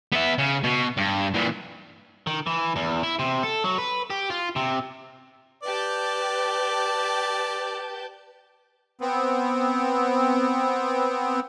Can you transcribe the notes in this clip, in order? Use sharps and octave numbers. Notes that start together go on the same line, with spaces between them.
B3 E5
C#3
B2
G2
A#2 E3
D#3
E3
E2
E4
C3
A4
F#3
B4
G4
F4
C3
G4 B4 D5 A5 G6
B3 C4